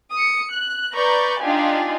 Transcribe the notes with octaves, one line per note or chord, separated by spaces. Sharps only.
D#6 C#7
F#6
B4 D5 A#5 C#6 G6
D4 D#4 F4 G4 G#5